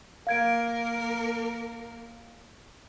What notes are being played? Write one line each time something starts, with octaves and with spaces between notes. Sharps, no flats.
A#3 A#4 F5 G#6 D7